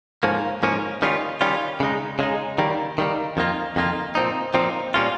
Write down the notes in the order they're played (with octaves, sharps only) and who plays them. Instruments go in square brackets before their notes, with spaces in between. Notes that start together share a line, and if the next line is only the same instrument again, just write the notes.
[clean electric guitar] G#2 F3 A#3 C#4
G#2 F3 A#3 C#4
D#3 G3 C#4 F4
D#3 G3 C#4 F4
C#3 G#3 D#4
C#3 G#3 D#4
D#3 G3 A#3
D#3 G3 A#3
F2 D#3 A#3 F4
F2 D#3 A#3 F4
A#2 F3 C4 D#4
A#2 F3 C4 D#4
A#2 G3 A#3 C#4 F4